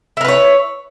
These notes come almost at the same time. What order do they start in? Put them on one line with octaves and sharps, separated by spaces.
E4 A#4 B4 C#5